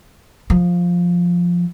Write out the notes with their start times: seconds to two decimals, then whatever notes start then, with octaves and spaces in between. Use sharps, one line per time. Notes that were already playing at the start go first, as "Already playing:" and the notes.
0.50 F3